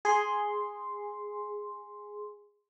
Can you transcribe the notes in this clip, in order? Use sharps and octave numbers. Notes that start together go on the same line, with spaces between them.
G#4 C6